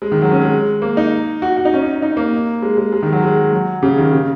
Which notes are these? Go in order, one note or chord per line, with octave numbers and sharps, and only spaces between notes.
G#3
D#3
F#3
C#4
G#3
A#3
D#4
F#4
F#4
D#4
C#4
D#4
D#4
A#3
G#3
G#3
G#3
D#3
F#3
G#3
F#3
C#3
D#3
C#3